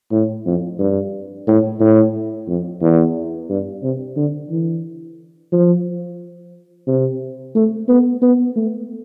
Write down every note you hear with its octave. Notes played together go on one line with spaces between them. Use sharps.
A2
F2
G2
A2
A2
F2
E2
G2
C3
D3
E3
F3
C3
A3
B3
B3
A3